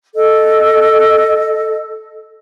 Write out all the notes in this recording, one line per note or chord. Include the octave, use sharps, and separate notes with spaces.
A4 D#5